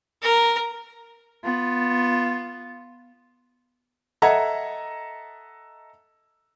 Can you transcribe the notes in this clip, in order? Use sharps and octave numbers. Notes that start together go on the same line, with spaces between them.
A#4
B3 F4
A4 D#5 E5 F#5 A#5 G#6